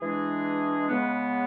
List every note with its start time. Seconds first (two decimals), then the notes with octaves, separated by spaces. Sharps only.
0.01 E3 G#3 D4 G#4
0.89 C#3 G#3 B3